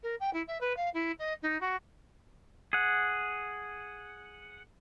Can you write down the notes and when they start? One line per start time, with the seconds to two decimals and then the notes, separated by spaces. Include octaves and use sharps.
0.03 A#4
0.20 G5
0.33 E4
0.47 E5
0.60 B4
0.76 F5
0.93 E4
1.19 D#5
1.42 D#4
1.60 F#4
2.73 G#4 F#5